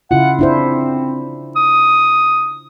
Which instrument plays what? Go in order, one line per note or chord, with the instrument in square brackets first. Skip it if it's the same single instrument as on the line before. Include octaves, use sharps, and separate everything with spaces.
[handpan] C#3 E4 F4 [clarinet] F#5
[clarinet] C4 [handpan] D4 E4 C5
[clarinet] D#6